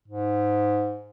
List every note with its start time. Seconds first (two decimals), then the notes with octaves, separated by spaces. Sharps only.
0.08 G#2